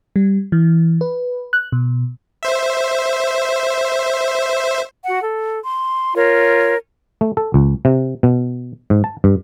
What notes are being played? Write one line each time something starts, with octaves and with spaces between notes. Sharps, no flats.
G3
E3
B4
F#6
B2
C5 E5
F#4 F#5
A4
C6
F4 A#4 C#5
A3
A4
C#2
C3
B2
G#2
A5
G2